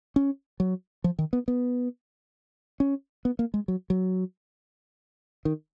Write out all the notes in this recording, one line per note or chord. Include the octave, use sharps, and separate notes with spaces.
C#4
F#3
F3
D#3
B3
B3
C#4
B3
A#3
G#3
F#3
F#3
D#3